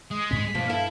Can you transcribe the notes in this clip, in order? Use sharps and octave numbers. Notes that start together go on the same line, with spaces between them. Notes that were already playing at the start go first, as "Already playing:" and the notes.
G#3 D#6
D2 G#2 C4 B6
G2 B2 F3 A#3
E4 A4 F5